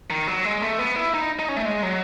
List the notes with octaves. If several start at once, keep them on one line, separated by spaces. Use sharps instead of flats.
D#3
F#3
G#3
A3
B3
E4
D#4
D#4
C#4
A3
G#3
F#3